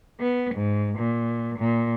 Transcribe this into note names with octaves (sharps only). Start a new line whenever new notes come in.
B3
G#2
A#2
A#2